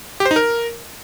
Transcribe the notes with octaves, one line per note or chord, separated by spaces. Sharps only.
G4
C5
D#4
A#4